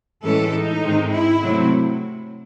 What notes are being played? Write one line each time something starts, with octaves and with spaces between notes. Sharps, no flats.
A2 E3 G#3 C#4 A4
D#4
G#2 D#3 G#3 C4
E4
C3 F#3 A3 C4